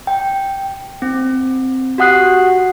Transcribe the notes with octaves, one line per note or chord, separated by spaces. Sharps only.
G5
C4
F#4 G4 F#5 D#6 F#6 C7